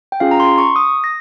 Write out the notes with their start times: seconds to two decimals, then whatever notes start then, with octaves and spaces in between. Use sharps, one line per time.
0.12 G5
0.20 C#4 F4 G#4 F5
0.31 A#5
0.40 C6
0.58 C#6
0.76 D#6
1.04 A#6